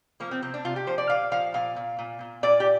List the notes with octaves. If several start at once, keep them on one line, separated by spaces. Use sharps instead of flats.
F3 A#3
C4
C3 C4
D4
C3 F4
G4
F3 C5
D5
A#2 F5
F3 F5
A#2 F5
A#2
A#2
A#2
A#2 D5
G4